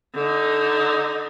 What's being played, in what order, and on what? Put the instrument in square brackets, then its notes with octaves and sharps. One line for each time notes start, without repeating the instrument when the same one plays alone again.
[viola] D3 D#4